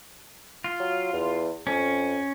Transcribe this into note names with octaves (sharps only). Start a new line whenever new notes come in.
F4
F#3
E2
F2 C#4